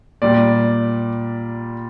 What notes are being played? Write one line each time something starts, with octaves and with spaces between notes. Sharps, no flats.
A#2 G3 D5